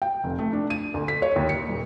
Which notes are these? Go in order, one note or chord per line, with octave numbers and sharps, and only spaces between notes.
G5
F1
A3
D4
D#7
D2
B6
C#5
D#2
C#7
D#1